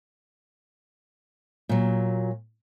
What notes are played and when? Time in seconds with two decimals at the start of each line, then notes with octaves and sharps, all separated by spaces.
1.69 A#2 F#3